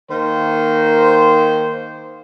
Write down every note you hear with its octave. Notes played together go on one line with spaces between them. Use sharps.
D#3 A#3 C5